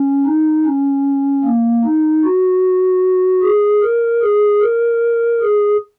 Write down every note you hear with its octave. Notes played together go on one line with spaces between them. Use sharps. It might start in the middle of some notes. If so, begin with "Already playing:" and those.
Already playing: C#4
D#4
C#4
A#3
D#4
F#4
G#4
A#4
G#4
A#4
G#4